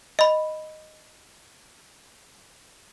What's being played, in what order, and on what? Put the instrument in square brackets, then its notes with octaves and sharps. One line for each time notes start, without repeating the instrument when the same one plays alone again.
[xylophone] D#5 B5